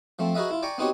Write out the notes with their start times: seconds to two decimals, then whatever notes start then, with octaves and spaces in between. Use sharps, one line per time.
0.19 F3 A3 C4
0.35 F#4 G#4 A#4 B4 D#5 E5
0.51 E4 F4
0.63 D5 G5 G#5 A#5 C#6
0.78 B3 C4 D#4 F#4 G4 C#5